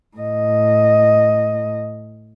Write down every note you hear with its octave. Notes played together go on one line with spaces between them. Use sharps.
A2 D#5